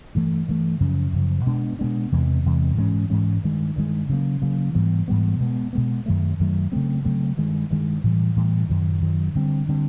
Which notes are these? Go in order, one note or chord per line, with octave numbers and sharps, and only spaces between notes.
G2 E3 A3
G2 E3 A3
F#2 C#3 F3
F#2 C#3 F3
B2 G#3 B3 D4
B2 G#3 B3 D4
E2 C3 E3 G#3
E2 C3 E3 G#3
G#2 E3 G#3 C#4
G#2 E3 G#3 C#4
G2 D#3 G#3
G2 D#3 G#3
C#3 F#3 A#3
C#3 F#3 A#3
G#2 E3 G3 B3
G#2 E3 G3 B3
B2 G#3 B3
B2 G#3 B3
F#2 D#3 F#3 A3
F#2 D#3 F#3 A3
C#3 F#3 A3 C4
C#3 F#3 A3 C4
G2 D#3 G#3
G2 D#3 G#3
A2 E3 G3
A2 E3 G3
F#2 D#3 F#3
F#2 D#3 F#3
D3 G3 C4
D3 G3 C4